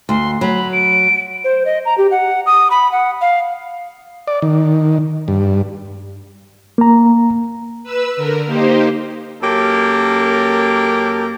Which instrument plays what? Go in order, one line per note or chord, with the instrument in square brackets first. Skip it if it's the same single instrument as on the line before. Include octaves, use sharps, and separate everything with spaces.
[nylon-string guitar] D2 [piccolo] C6
[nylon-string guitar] F#3 [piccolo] B5
[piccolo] D7
[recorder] C5
D#5
A#5
G4
F#5
D#6
B5
F#5
F5
[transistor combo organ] D5
D#3
G2
[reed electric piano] A#3 A#5
[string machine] B4 E6
D3 A#4
A#3 D#4 G4 C5
[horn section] F#2 A#3 C#4 G4 A4 A#4